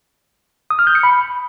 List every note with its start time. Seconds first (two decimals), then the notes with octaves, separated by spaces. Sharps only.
0.70 D#6
0.79 F6
0.87 G6
0.95 C#7
1.03 B5